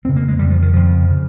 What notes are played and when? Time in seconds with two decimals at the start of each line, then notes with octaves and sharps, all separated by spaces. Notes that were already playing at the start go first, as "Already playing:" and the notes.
0.05 F2 C4
0.09 C#3
0.16 A#3
0.28 G#3
0.39 F2 C#3 G3
0.51 F3
0.62 D#3
0.73 F2 C#3 F3
1.11 C#3